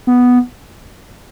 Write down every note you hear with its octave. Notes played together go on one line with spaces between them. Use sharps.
B3